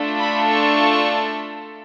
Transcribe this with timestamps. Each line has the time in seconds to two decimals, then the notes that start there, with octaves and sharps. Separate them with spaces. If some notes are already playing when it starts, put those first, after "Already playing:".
Already playing: A3 D4 F4 A4
0.19 B5
0.49 C#6